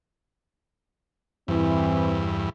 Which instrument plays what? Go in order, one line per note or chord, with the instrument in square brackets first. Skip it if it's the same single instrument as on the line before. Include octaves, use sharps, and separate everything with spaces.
[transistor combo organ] E2 G2 [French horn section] E3 C4